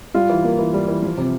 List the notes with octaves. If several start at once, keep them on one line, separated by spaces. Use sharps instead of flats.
G3 F4
E3
A#3
E3
G3
E3
F3
C3